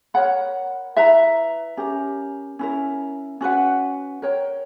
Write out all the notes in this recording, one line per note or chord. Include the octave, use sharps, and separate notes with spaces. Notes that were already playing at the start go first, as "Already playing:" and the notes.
A#4 C#5 F#5 B5
E4 B4 E5 A#5
C#4 G4 A#4
C#4 E4 A#4
C#4 F#4 B4 F#5
A#4 C#5 G5